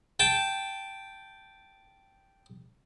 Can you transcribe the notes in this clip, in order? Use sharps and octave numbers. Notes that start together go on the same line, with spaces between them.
G5 A5